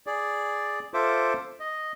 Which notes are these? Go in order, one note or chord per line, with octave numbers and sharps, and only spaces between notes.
G#4 D5
F4 A4 C5 E5 D6
D#5